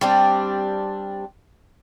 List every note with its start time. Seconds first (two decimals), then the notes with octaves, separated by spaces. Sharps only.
0.01 G3 C4 D4